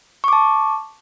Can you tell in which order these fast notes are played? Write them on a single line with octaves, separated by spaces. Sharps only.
C#6 D6 A5